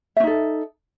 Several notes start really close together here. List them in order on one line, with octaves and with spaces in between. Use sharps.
E5 C#4 D#4 A4